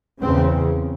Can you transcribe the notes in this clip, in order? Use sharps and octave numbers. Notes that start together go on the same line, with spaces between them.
E2 C#3 C4